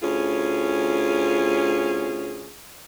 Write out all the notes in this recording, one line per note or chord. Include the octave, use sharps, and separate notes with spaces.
D2 C#4 F4 G#4